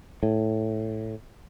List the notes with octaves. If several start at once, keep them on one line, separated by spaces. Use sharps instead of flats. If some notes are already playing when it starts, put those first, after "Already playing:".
A2